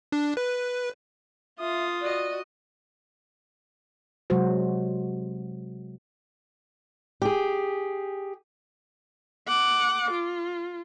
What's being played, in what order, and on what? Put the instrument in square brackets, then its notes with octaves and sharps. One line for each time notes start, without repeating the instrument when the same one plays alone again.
[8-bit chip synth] D4
B4
[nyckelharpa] F4 D#6 [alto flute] E5
[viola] F#4 D#5 [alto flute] D5
[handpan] C3 F#3 G#3 F#4 C5
[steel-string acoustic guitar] G4 G#4
[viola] F#5 D6
F4